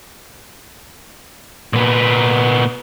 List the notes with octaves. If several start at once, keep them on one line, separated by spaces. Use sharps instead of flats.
A#2 B3